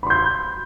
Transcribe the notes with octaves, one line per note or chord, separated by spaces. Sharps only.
B5 C6 G6